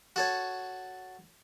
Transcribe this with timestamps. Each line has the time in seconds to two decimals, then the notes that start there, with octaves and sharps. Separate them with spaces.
0.16 F#4 A4 C#5